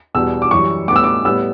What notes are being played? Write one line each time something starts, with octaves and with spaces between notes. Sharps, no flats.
E2 B2 G3 B3 E6
D6
F#2 E3 G3 C#6
A2 G3 B3 D6
E6
D6
A2 G3 B3 E6